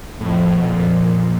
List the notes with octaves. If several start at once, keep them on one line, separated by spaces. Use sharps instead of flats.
F2 A2
B2
F2 A#2